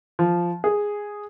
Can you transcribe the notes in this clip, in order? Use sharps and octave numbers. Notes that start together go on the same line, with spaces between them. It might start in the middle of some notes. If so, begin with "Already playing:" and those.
F3
G#4